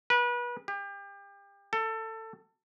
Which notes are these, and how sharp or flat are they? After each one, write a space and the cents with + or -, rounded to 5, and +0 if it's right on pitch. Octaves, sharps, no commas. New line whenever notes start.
B4 -30
G4 +30
A4 +20